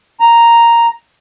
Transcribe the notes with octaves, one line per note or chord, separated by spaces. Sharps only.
A#5